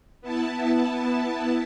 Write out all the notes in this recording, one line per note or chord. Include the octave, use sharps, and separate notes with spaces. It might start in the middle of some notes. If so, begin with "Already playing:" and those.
B3 E4 A5